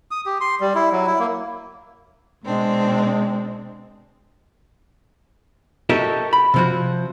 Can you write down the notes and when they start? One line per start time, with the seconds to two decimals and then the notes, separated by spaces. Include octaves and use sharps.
0.11 D#6
0.26 G4
0.41 C6
0.60 G3
0.75 E4
0.92 F#3
1.06 E4
1.19 A#3
2.44 B2 G#3 C4 D4
5.89 F#4 G4 A4 A#4 D#5 E5
6.33 B5
6.54 C3 F3 F#4